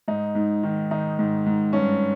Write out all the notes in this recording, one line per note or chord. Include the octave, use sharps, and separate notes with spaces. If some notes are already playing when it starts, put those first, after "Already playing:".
G#2 D#4
G#2
D#3
D#3 D#4
G#2
G#2
G2 C#4